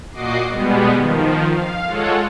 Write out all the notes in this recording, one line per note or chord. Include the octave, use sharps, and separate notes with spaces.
A#2 F#4 D#5 D6 C7
B2 G3 G#3 B3
D#3 F3
F5
G#3 F4 A4 C#5 F#5